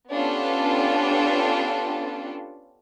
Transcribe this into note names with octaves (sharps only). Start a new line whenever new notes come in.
B3 C#4 D4 F4 G4 A4